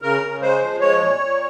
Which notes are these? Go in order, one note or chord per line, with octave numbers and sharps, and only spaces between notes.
C#3 A#4
C#3
G#3 C5
F3
G#3 C#5
A#2
A#2